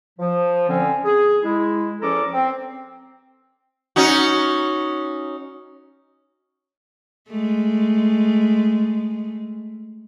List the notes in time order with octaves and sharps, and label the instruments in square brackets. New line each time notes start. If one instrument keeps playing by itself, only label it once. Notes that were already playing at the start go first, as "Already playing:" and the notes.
[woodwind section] F3
D3 C4 C#4
G#4
G#3 E4
E2 F3 C#4 A4 A#5 D6
C4
[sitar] C#4 D#4 F#4
[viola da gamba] G#3 A3